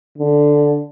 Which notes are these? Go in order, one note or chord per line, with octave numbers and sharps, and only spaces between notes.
D3